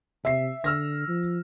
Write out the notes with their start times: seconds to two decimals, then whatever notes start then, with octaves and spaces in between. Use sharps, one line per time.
0.25 C3 E5 C7
0.64 D3 E6 F6 A#6
1.08 F3